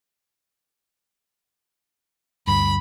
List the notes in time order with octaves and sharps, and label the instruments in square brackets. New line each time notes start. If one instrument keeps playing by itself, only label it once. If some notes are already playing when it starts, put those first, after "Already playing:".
[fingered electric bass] D2 G2 [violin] B5